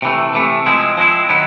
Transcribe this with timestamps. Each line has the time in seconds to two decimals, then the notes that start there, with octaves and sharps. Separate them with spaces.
0.02 C3 E3 A3
0.35 C3 E3 A3
0.66 F3 G#3 C4 E4
0.97 F3 G#3 C4 E4
1.29 D#3 F#3 B3 E4